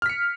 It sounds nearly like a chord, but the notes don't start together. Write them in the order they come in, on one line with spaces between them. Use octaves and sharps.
F6 B6 C#7